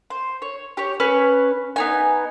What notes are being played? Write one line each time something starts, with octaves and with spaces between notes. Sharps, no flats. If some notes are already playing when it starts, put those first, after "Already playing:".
C5
C#5
G4 C#5
C#4 B4 C#5
B3 D#4 G#5